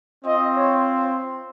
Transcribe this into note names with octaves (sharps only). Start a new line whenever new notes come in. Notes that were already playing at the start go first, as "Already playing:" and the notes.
C4 F4 D#5
C#5